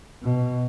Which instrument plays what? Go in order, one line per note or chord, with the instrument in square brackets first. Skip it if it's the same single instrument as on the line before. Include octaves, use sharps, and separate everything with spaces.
[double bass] B2